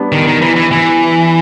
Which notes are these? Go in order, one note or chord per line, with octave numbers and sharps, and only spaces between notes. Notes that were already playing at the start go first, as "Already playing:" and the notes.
Already playing: G3 B3 D4
D#3
D#3
E3
E3
E3